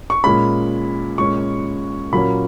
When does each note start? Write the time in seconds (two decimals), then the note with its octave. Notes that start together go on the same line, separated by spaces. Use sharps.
0.10 C#6
0.24 A#2 G#3 C#4 B5
1.18 A#2 G#3 C#4 C#6
2.12 A#2 F#3 A#3 C#4 B5